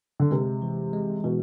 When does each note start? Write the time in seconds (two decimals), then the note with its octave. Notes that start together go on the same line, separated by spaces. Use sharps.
0.20 D3
0.31 C3 G#3
0.62 E3
0.93 G#3
1.24 B2 E3